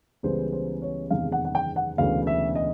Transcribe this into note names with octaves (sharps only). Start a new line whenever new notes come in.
C#2 C#3 E3 G3 B3 C5
C5
C#5
F#1 E2 C3 D#3 G#3 F5
F#5
F#5
G5
F#5
E1 D2 C#3 E3 F5
E5
D#5